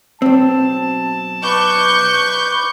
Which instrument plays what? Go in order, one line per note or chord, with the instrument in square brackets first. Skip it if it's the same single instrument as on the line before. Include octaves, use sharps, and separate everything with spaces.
[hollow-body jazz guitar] B1 C4 [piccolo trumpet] A5
[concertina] B4 D6 [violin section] C#6 G6